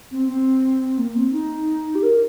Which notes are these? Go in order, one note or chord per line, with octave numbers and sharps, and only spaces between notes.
C4
C4
A#3
C4
D#4
G4
A#4